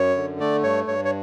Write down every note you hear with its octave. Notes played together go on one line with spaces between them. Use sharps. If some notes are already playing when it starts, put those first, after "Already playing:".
Already playing: F#2 C#5
D3
A3 D5
G2 C#5
G2 C#5
C#5